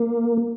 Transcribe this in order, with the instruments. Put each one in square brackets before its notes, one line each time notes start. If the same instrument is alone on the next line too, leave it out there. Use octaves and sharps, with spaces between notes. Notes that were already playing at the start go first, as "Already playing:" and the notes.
Already playing: [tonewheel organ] A#3